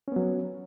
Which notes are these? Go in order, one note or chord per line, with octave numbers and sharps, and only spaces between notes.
F#3 B3 C#4